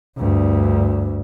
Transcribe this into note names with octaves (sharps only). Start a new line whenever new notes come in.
D2 G2